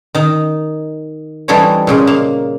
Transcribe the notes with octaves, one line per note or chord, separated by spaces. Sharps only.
D#3 D#4
E3 G3 D#4 A4 C5 C#5
A#2 C#3 G#3
A#3